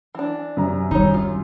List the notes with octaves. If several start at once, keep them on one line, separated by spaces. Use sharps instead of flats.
E3 D4
F#2 C3 A#5
D#3 G3 D#4 C#5
F4